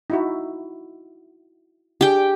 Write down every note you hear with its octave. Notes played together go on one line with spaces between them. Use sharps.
D#4 E4 F#4
D4 G4 G#4 G5